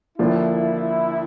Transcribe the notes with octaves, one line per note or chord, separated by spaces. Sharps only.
D#2 D3 F3 A#3 D4 E4